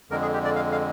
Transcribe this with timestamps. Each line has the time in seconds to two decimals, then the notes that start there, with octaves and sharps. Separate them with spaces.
0.10 F2 D3 G#3 A#4
0.22 G#4
0.34 G4
0.45 D5
0.56 F5
0.72 F5